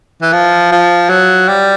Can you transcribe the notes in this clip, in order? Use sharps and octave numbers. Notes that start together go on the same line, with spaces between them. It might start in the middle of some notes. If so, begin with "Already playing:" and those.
E3
F3
F3
F#3
G3